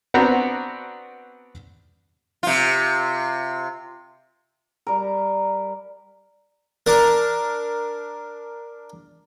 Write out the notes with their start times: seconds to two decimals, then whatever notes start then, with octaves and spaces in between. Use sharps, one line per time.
0.14 B3 C4 D4 F#4 F#5 A#5
2.43 C3 F4
4.87 G3 A#4
6.86 D4 A#4